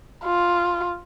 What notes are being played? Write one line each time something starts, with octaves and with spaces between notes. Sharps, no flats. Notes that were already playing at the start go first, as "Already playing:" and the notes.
F4